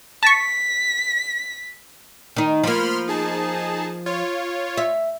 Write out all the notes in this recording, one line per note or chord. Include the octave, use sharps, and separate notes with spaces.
A5 C#6 B6
D#3 D#4
F3 A#3 B5 C6 F6
D#4 G#4 A5
F4 C#5
E5